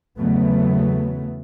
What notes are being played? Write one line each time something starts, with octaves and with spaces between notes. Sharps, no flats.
E2 C#3 F#3 A3 B3